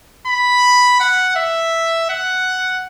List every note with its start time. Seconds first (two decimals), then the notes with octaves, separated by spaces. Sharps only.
0.27 B5
1.00 F#5
1.36 E5
2.09 F#5